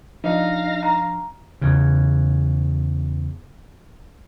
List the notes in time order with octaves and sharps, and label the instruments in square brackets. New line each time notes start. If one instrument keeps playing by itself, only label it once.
[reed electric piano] F3 D4 [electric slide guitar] D#4 [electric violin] F5 A#6
[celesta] A#5
[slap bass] E2 C#3